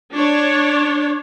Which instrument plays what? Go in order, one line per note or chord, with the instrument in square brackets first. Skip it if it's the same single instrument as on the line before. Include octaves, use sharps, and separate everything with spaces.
[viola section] D4 C#5